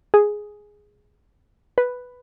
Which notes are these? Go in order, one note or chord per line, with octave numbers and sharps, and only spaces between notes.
G#4
B4